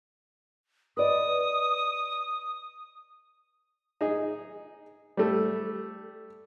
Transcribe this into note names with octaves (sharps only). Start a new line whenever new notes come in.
B4 D5 D#5 D#6
D#4 G#4
G3 A3